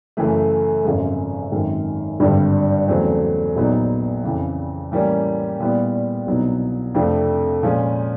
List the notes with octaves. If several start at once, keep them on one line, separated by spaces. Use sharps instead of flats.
F#2 C#3 E3 A3
G#1 F#2 C#3 F3 G#3
G#1 F#2 D#3 G#3
G#1 G2 D3 G3
E2 C#3 F#3 A3 C4
A#1 A#2 F#3 B3 D#4
F2 C#3 E3
A2 E3 G3 A#3 C#4
A#2 G3 B3 E4
C2 B2 F#3 B3 D#4
F2 C3 F3 A3 D4
A#2 F3 G#3 C#4